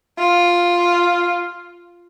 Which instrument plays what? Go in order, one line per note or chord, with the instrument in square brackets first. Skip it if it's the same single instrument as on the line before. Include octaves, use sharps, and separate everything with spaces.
[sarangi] F4